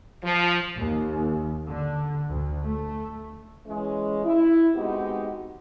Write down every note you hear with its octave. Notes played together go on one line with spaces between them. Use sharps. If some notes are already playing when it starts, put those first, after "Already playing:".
F3
D#2
D3
D2
A3
E3 G#3 C#4
E4
G#3 B3 C4 D#4 F#4 G4